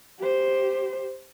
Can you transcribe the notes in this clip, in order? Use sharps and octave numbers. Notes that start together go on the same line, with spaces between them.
G4 C5